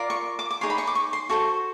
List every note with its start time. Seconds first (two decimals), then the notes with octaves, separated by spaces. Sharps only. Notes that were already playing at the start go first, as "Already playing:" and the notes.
Already playing: F4 A#4 D5
0.10 C#6
0.39 D6
0.51 D6
0.61 D#4 G#4 C#5 C6
0.70 B5
0.78 C#6
0.87 D6
0.95 C#6
1.13 C6
1.29 F#4 A4 C5 C#6